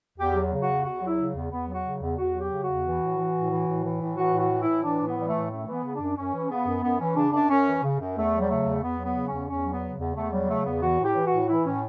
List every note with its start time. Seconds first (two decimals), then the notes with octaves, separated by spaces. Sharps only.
0.18 E2 G4
0.35 F#3
0.51 C#3
0.62 F#4
0.68 E2
0.84 E2 F#4
1.01 F#3
1.07 E4
1.18 C#3
1.34 E2
1.51 E2 B3
1.68 F#3
1.73 F#4
1.84 C#3
2.01 E2
2.17 E2 F#4
2.34 F#3
2.39 G4
2.50 C#3
2.62 F#4
2.67 E2
2.84 E3
3.00 A2
3.17 E3
3.34 A2
3.51 E3
3.67 A2
3.84 E3
4.00 A2
4.17 E3 F#4
4.33 A2
4.39 F#4
4.50 E3
4.61 E4
4.67 A2
4.83 E3 D4
5.00 A2
5.06 B3
5.17 E3 G3
5.28 A3
5.33 A2
5.50 F#2 A3
5.66 E3
5.72 B3
5.83 C#3
5.95 F#2 D4
6.16 F#2 C#4
6.33 E3
6.49 C#3 B3
6.66 F#2
6.83 F#2 B3
6.99 E3 C#4
7.16 C#3 D4
7.33 F#2 D4
7.49 F#2 C#4
7.66 E3
7.83 C#3
7.99 F#2
8.16 E2 A3
8.32 F#3
8.40 G3
8.49 C#3 A3
8.66 E2
8.82 E2 B3
8.99 F#3
9.04 B3
9.15 C#3
9.27 C#4
9.32 E2
9.49 E2 C#4
9.65 F#3
9.71 B3
9.82 C#3
9.99 E2
10.15 E2 A3
10.32 F#3 G3
10.49 C#3 A3
10.65 E2 B3
10.82 E3 F#4
10.98 A2
11.04 G4
11.15 E3
11.26 F#4
11.31 A2
11.48 E3 E4
11.65 A2 C#4